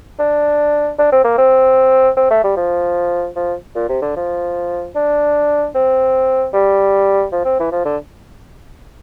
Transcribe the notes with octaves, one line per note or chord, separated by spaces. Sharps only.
D4
D4
C4
A#3
C4
C4
A3
G3
F3
F3
A#2
C3
D3
F3
D4
C4
G3
F3
C4
E3
F3
D3